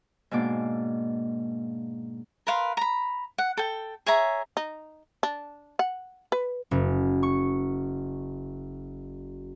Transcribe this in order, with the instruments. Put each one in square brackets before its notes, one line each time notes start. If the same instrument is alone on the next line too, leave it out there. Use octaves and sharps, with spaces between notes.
[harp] G#2 B2 A#3 D4 D6
[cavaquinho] A#4 B4 F5 C6
A#5 B5
F#5
A4 G5
G#4 C#5 E5 A#5
[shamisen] D#4
D4
F#5
B4
[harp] F#1
C#6